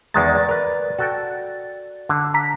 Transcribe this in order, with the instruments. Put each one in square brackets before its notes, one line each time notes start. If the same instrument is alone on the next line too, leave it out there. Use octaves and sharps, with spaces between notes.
[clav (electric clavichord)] E2 D#3 G#3 [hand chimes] A#5 D6 [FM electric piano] A6
[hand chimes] D5
[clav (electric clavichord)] A#4 B4
F#4 A4 G5
D3
[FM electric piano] A#5 B6